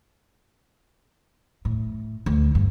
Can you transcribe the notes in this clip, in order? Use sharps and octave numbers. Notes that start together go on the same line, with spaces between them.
A2
D2
G2